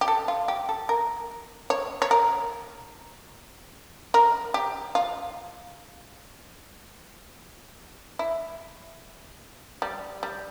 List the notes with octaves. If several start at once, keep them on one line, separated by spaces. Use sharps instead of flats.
G4
A4
F4
G4
A4
A#4
C#5
C#5
A#4
A#4
G4
F4
E4
G3
G3